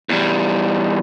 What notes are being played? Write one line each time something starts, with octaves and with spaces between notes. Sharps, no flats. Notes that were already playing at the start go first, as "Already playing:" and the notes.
E2 G3